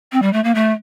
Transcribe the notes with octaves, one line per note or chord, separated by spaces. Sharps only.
C4
G3
A3
A#3
A3